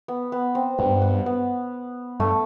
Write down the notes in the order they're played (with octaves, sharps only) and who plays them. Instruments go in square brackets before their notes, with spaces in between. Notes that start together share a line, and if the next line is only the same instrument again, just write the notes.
[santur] B3
B3
C4
[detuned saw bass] G2 [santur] B3
[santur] B3
B3
[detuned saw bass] G2 [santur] A3